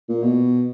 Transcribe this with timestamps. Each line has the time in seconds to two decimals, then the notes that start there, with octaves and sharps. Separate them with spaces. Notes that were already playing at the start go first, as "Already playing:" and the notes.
0.09 A#2
0.23 B2